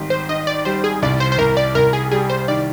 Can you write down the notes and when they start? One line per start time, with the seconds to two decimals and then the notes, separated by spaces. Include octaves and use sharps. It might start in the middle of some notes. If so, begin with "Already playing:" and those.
Already playing: G#1 G3
0.10 C5
0.29 D#3 D#5
0.47 D5
0.65 G3 C5
0.84 G#4
1.02 C2 D5
1.20 C5
1.32 C5
1.38 C2 A#4
1.57 D5
1.75 C2 A#4
1.93 G#4
2.11 G3 G#4
2.29 C5
2.48 D#3 D5